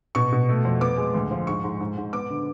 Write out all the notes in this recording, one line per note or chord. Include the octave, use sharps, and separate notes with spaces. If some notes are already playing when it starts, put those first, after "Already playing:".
B2 C#6
B2
A3
F2
B3 D6
G#3
D2
F3
G#2 C#6
G#2
G#2
G#2
B3 D6
D3